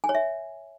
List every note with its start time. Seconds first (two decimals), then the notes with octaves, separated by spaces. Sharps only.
0.04 G#5
0.09 C#5
0.15 E5